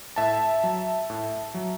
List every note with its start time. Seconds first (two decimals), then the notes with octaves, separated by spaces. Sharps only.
0.16 A2 E5 A5
0.63 F#3
1.10 A2
1.54 F#3